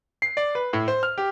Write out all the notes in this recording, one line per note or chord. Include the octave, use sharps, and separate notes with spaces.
C7
D5
B4
A2
C5
F6
G4